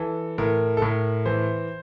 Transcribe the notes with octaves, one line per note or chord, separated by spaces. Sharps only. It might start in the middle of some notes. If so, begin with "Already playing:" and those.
Already playing: E3 A4
A2 A#4
A4
A2 A#4
E3 C5